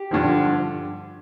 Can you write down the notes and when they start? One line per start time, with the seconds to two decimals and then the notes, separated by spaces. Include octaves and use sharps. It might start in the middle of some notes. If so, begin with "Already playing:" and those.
Already playing: G4
0.11 G2 D3 F3